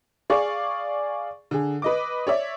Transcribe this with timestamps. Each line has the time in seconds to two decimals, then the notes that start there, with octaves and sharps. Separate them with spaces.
0.30 G#4 D5 F5 C#6
1.51 D3 G#4
1.82 B4 D#5 D6
2.27 C#5 D5 E5